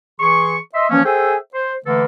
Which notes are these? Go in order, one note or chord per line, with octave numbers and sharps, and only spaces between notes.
E3 G#4 C6 C#6
D#5 E5 C6
E3 F3 A#3 C#4
G#4 A4 C5 E5 G5 G#5
C5
D3 E3 A3 A#3 A4 B4